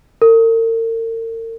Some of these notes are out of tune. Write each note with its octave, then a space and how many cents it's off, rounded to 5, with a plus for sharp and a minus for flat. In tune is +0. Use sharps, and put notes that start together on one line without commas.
A#4 -45